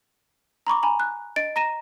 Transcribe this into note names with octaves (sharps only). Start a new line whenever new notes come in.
A#5 B5 C#6 D6
G#5 A#5 B5
F#6
D#5 A6 D7
A#5 A#6 D#7 E7